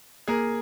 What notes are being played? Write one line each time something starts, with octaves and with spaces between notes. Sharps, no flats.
A#3 G#4 A#4